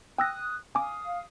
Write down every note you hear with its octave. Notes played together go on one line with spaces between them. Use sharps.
G5 D#6 E6 F#6 A#6
F5 G#5 D6 D#6